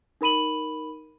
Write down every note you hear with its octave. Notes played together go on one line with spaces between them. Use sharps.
D#4 A#4 B5 D#7 F#7